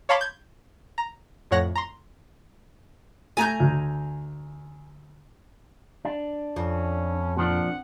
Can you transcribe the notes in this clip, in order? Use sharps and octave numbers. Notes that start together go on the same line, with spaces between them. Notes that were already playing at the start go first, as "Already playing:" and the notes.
C#5 F5 A5 B5 C6 D6
G6 G#6
A#5
F2 A2 C#5 F#5 A#6
A#5 C6
A3 G#5 A#5 G6
D2
D4
F2 C#4
A#2 F3 D4 F#5